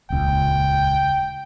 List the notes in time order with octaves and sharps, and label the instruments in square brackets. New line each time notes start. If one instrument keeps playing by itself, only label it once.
[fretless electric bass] D#1 C#2 [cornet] G5